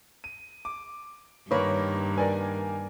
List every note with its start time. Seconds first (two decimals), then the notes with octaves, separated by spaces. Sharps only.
0.24 D#7
0.65 D6
1.51 G2 D#3 A#3 B4 C#5 B5
2.18 A#4 B4 D5 G#5